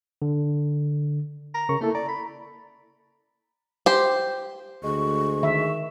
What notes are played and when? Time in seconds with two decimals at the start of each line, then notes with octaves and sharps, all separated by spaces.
0.22 D3
1.54 A#5
1.69 C#3 A#4 C#6
1.81 A3 A#3 E4 A4
1.95 D5 A#5
2.08 B5
3.86 G4 C5
4.84 D2 G#3 C#6
5.43 D#3 E5